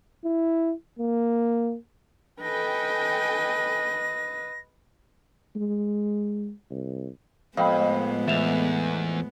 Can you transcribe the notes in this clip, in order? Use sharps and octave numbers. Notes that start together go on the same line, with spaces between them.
E4
A#3
A4 B4 D#5 G5 G#5 A#6
G#3
C2
F2 A2 G#3 B3 F5 G5 B5
E2 E5 E7 F7